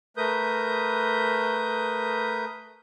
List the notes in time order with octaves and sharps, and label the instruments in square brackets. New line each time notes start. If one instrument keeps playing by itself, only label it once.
[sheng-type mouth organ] A3 A#4 B4 D#6 G6